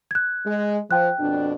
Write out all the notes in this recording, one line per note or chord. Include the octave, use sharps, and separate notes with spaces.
F#6 G#6
G#3
F3 G5 F#6
F2 B2 D4